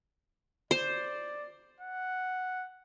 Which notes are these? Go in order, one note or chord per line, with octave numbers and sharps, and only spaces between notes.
C5 D5
F#5